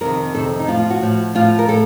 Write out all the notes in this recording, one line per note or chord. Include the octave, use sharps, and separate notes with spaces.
F2 C3 D#3 A#4
F2 C3 D#3 A4
D#4
A2 F3 F4
F4
F#4
A2 F3
A2 F3 F4
A#4
A2 A4